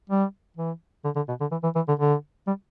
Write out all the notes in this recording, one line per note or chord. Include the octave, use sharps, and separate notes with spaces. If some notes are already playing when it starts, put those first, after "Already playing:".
G3
E3
D3
D3
B2
D3
E3
E3
E3
D3
D3
G3